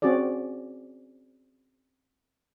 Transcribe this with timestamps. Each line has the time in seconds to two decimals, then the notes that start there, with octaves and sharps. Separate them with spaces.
0.02 C4 C#4 F#4 G#4 D5